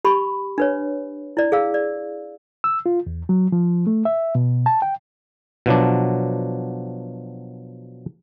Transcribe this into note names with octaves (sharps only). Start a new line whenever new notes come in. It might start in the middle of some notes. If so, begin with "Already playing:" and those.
G4 B5 C#6
D4 B4 C#5
E4 D5
G#4 F5 E6
D5
E6
F4
E2
F#3
F3
A3
E5
B2
A5
G5
B2 F3 F#3 D4